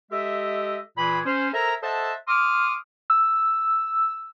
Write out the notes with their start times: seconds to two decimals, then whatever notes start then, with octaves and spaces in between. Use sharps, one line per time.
0.11 G#3 G4 A4 D#5 E5
0.97 A#2 E3 G#4 B5
1.25 C#4 C5
1.53 A4 A#4 C5 E5 G#5 A#5
1.83 A4 C5 D#5 E5 F#5 A5
2.28 C6 D6 D#6 F6
3.10 E6